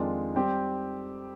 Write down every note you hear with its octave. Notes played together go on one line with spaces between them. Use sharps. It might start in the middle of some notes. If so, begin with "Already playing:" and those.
Already playing: F2 D#3 G#3 D4 F4
G3 C4 G4